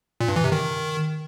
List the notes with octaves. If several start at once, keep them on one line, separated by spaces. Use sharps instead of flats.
A#2
G2
E3
C3
D#3